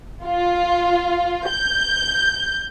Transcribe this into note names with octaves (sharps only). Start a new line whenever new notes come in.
F4
G6